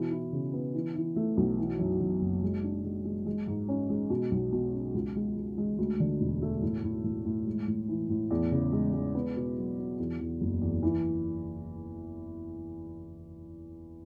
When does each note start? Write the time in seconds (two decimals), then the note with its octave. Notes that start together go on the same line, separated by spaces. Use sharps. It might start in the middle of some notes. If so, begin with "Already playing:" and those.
Already playing: B2 E3
0.11 E4
0.32 C#3
0.53 B3
0.75 E3
0.95 E3
1.16 A3
1.37 B1
1.59 E3
1.79 F#2
2.00 F#2
2.21 F#1
2.42 G#3
2.64 D4
2.84 G#3
3.05 G#3
3.26 G#3
3.47 G#2
3.69 C#4
3.89 G#3
4.10 B2
4.31 B1
4.52 B2
4.73 C#4
4.94 C#2
5.16 G#3
5.37 G#3
5.58 G#3
5.78 D2
6.00 D3
6.21 E1
6.42 A3
6.62 A2
6.84 A2
7.04 A2
7.26 A2
7.47 G#3
7.68 A2
7.88 E3
8.10 A2
8.30 E2
8.51 C#3
8.73 G#3
8.93 G#3
9.15 B3
9.36 B2
9.57 F#3
9.77 F#4
9.99 E2
10.20 E2
10.41 F#1
10.61 E2
10.83 E3